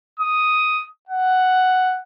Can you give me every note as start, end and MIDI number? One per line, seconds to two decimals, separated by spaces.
0.20 0.85 87
1.09 2.01 78